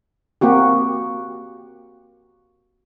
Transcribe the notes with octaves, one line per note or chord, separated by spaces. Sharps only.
A#3 C4 F#4 G4